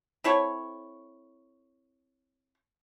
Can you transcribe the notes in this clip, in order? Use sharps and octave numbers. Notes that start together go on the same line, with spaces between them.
C4 E4 A4 C#5